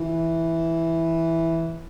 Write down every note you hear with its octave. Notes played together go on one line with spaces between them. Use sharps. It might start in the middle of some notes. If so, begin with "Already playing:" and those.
Already playing: E3